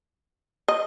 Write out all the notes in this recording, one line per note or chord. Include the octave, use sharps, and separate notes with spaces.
D#5